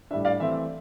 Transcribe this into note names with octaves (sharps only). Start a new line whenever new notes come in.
A2 G3 D4 E5
D5 F5
E3 A3 C4 E5